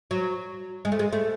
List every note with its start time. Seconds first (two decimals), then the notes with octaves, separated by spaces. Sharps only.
0.11 F#3
0.85 G#3
0.92 A3
0.99 G#3
1.13 A3